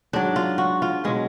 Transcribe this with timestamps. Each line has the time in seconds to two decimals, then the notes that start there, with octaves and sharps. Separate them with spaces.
0.13 G#2 F#3 D4
0.36 F4
0.58 F#4
0.82 F4
1.04 B2 F#3 G#3